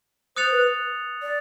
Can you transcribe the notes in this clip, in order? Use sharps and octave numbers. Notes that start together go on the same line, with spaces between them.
C5 D#6 F#6 A6 C#7 F7
B4
D5